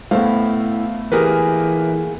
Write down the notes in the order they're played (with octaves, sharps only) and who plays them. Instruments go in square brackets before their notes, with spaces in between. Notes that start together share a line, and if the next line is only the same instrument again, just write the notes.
[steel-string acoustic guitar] A2 E4 [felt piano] A3 B3 [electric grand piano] C5 F5
[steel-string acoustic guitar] A#2 A#3 G#4 [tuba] E3 [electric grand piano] G4 A#4 B4